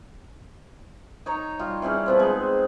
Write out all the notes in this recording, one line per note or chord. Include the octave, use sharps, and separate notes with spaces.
D#4 C#5 A#5
G3 F4 D#5
E3 G3 C#4 G#4
F3 B3 C4
G#3 D#4